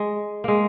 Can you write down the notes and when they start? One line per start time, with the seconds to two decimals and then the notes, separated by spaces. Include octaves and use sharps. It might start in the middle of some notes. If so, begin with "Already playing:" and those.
Already playing: G#3
0.44 G#3 A#3